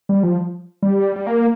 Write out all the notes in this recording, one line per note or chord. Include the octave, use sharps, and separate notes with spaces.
G3
F3
G3
G3
A#3